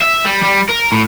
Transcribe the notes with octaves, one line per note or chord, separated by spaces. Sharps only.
E5
G3
G3
A#4
A2